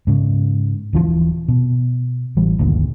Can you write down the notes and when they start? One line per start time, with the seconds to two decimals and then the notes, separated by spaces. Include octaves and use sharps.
0.07 G#2 C#3
0.93 D#1 E3 F3
1.48 B2
2.37 A1 E3 G3
2.59 G1 D2 A#2 D#3